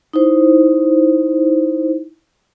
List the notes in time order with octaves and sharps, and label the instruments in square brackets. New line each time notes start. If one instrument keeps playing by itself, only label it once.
[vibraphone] D#4 E4 C5